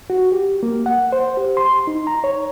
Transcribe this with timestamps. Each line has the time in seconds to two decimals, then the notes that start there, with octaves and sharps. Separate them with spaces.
0.10 F#4
0.32 G4
0.63 A#3
0.86 F#5
1.12 C5
1.37 G4
1.57 C6
1.87 D#4
2.07 A#5
2.24 C#5